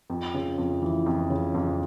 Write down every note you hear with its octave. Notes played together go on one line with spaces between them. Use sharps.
F2
C#3
F2
E3
F2
C#3
F2